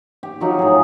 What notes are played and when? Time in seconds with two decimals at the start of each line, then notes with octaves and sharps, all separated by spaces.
0.23 G4
0.40 F3 F#3 D#4 F4
0.59 A2 G#4